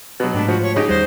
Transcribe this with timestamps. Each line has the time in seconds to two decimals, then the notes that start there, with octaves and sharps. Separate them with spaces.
0.20 B2 F#3
0.34 G#2 A3 D4 B6
0.48 F3 F#4
0.62 C#5
0.76 C#3 D#4 G4
0.89 D#2 G3 C5